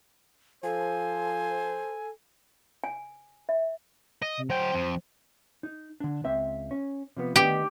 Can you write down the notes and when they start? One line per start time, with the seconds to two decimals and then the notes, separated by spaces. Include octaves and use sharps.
0.64 F3 A4 C5 G#5
2.84 G#5
3.49 E5
4.22 D#5
4.38 C3
4.50 F#3 C5 G5
4.73 F2
5.63 D#4
6.00 D3 D4
6.25 C#2 C4 E5
6.71 C#4
7.17 C3 F3 B3
7.36 D#3 B3 D#4 G4